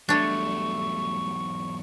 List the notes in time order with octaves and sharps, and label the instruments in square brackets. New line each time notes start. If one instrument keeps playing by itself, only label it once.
[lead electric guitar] E2 F#3 [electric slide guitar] G3 A3 [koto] D4 C#5 [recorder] C#6